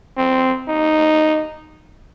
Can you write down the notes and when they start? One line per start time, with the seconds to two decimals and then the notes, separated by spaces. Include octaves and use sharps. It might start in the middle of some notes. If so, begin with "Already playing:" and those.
0.17 C4
0.69 D#4